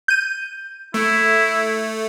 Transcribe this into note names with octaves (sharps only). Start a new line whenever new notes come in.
G6 D#7
A3 E4